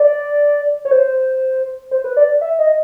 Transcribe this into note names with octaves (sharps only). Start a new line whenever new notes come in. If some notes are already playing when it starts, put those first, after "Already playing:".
Already playing: D5
C#5
C5
C5
B4
D5
E5
D#5